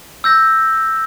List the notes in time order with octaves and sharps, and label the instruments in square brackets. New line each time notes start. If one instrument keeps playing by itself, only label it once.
[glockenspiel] E6 G6 A#6